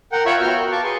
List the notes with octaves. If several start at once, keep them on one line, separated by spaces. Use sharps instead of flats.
A#4 F#5 G5
F4 C#5 E5 G5 B5 C#6
B3 F#4 G5 F6
A#4
F5 A5 C#6 D6
G#4 B4 C6 C#6